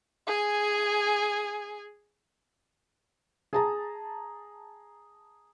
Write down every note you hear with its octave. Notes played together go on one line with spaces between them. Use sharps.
G#4 G#5
G#4 A5 A#5